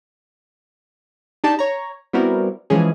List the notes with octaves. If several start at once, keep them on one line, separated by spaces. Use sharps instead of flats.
D4 D#4 G4 D5 A5
C#5 A#5
G3 B3 C4 E4 F#4 A#4
E3 F3 G#3 C#4 G#4